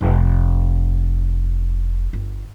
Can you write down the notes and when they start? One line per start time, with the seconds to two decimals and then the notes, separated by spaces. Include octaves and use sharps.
0.01 F1
2.13 G1